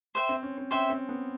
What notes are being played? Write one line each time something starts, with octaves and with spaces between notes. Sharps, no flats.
C5 E5 G5
C4
C#4
C4
C#4 C5 E5 G5
C4
B3